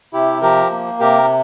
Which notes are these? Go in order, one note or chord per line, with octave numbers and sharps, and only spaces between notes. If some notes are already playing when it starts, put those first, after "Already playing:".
C3 E4 G4
F3 G4 A#4
A#3
C3 G4 A#4